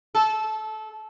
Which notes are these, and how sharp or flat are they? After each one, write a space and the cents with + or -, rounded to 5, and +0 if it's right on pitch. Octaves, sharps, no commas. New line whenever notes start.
A4 -20